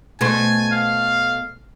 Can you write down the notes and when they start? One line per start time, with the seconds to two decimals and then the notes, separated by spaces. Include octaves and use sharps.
0.21 B2 A3 C5 G#5
0.71 F5